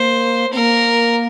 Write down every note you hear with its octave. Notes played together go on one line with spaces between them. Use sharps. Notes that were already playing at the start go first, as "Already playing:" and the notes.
Already playing: A#3 C5
A#3 C4 A#4